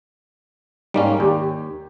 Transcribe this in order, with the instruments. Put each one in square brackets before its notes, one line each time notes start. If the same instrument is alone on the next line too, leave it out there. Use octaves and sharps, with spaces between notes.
[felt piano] G#2 D5 [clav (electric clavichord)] G3 A#3 C#4
[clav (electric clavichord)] D#2 [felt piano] G4